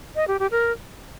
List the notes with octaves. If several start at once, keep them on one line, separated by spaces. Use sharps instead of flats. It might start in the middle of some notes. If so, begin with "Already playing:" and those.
D#5
G4
G4
A#4